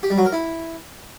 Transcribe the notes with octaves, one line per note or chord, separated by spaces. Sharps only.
G4
G3
F#3
A#4
E4